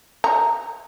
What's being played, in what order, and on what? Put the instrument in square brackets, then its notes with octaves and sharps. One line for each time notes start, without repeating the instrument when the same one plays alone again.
[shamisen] A#5